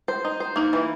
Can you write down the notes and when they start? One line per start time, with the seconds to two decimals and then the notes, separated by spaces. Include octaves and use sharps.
0.08 C5
0.25 D#4
0.40 C5
0.56 A#3 D#4
0.73 E3